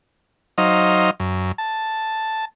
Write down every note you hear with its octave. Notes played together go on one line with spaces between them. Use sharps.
F#3 D#4 C5 D#5 F5
F#2
A5